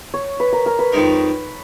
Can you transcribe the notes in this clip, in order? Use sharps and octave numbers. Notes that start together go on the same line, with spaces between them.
C#5
B4
A#4
A#4
B4
F2 D#3 G#3 D#4 A#4